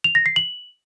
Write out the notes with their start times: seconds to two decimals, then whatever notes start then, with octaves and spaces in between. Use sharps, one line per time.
0.04 F7
0.15 A#6
0.26 C7
0.36 F#7